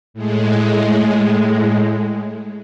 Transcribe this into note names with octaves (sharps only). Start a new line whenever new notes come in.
A2 G#3